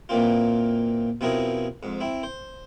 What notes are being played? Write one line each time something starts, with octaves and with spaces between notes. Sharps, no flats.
A#2 E3 F3 A#3 C4 F4
B2 F3 C4 E4 G#4 A#4
F2 G#2
C4 E4
C5